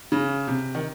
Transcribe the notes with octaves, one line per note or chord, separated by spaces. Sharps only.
C#3
C3
D#3